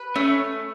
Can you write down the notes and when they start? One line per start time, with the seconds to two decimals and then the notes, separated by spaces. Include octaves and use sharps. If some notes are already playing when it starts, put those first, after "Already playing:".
Already playing: B4
0.16 A3 C#4